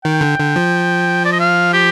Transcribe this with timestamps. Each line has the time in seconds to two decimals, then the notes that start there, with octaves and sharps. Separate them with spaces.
0.05 D#3 G5
0.21 D3
0.39 D3
0.56 F3
1.25 D5
1.33 D#5
1.40 F5
1.74 G4